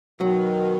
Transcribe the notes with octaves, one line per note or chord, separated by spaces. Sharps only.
B2 D#3 F#3